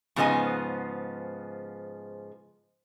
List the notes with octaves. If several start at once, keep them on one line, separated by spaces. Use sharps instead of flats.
G#2 C#3 F3 B3 D#5 G#5